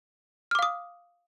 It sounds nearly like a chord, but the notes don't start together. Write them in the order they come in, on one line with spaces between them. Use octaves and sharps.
F6 D6 F5 D#6